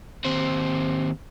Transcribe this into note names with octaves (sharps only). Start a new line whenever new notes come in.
D#2 C4